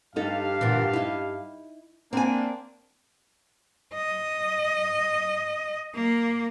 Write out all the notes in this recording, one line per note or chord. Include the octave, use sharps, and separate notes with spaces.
G2 D#4 G4 A4 F5
A#2 D3 E3
D#4 E4
A#3 C4 D4 G#5
D#5
A#3